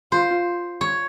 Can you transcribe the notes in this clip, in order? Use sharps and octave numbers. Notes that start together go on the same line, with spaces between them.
F4 C5
C#5